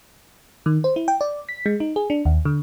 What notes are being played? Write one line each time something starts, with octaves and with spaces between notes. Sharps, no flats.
D#3
C5
E4
G5
D5
B6
G#3
D#4
G#4
D4
D#2
D3